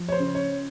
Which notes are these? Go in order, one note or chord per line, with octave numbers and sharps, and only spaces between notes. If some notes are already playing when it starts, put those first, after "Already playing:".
Already playing: F3
C#5
C5
C#3
C#5